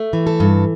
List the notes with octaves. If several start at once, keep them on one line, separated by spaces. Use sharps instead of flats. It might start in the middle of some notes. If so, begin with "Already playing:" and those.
Already playing: A3
E3
A4
G2